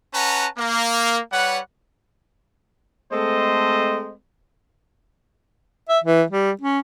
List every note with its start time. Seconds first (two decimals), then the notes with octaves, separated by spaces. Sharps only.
0.14 C#4 B4 F#5 A5 A#5
0.58 A#3
1.32 G3 B4 C#5 F#5
3.12 G#3 A3 C4 A4 C5 D#5
5.89 E5
6.04 E3
6.30 G3
6.61 C#4